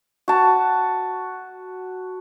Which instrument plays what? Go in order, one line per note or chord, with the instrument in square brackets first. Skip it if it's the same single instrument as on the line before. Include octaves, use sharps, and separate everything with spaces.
[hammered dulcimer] F#4 A5